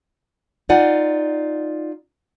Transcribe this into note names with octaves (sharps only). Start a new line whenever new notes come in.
D#4 F4 D5 F#5 G#5